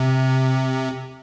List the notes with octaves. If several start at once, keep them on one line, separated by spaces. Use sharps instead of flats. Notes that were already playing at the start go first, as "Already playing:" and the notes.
Already playing: C3